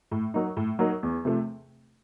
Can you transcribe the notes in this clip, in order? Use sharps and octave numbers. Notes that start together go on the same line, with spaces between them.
A2
F#3 A#3 D#4
A2
F#3 A#3 D#4
E2
C3 F3 A3